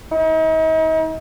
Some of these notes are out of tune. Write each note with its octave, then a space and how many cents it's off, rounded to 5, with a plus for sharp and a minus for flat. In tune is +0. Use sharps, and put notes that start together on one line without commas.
D#4 +40